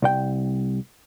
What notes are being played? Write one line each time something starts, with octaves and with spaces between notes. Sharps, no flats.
C2 G5